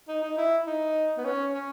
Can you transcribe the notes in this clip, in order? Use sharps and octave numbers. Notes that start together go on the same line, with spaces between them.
D#4
D#4
E4
D#4
B3
C#4
C#4